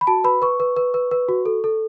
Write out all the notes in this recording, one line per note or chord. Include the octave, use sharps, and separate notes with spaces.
B5
F#4 A5
B4 B5
B4 C#6
B4
B4
B4
B4
F#4
A4
A4